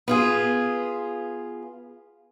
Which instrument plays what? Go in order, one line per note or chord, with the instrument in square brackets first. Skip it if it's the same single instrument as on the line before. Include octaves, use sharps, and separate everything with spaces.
[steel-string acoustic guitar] B3 F4 G#4